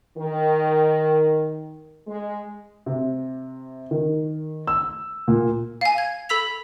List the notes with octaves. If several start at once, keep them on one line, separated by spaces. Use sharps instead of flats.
D#3
G#3
C3
D#3
E6
A#2
F5 G#5
G#6
A4 B5 E6 B6 F7